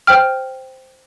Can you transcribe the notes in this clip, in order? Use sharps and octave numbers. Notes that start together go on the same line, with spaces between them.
C5 G5 F6